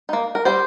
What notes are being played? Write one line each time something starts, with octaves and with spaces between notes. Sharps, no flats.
A#3 D#4
A#4
G3 G4 C5